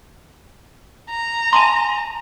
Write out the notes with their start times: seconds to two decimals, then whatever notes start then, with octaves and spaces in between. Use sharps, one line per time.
1.10 A#5
1.53 G#5 A5 C6